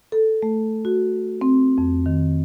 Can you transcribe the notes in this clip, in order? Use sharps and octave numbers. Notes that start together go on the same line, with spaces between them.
A4
A3
F#4
C4
F2
D#3